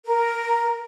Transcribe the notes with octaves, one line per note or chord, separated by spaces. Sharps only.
A#4